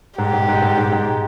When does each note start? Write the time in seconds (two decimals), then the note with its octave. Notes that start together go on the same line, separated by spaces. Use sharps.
0.18 G#2 G4
0.33 G#2
0.48 G#2
0.62 G#2
0.77 G#2
0.92 G#2